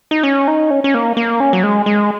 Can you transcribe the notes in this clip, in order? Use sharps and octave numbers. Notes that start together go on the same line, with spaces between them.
D#4
C#4
D#4
C#4
C#4
A#3
A#3
C#4
F#3
G#3
G#3